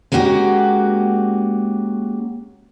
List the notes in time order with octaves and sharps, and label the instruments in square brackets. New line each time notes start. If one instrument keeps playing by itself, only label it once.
[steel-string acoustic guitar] G#3 A#3 C#4 F#4 G4